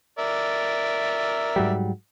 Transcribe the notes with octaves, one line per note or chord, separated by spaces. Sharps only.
A#4 D5 E5
G#2 F#3 G3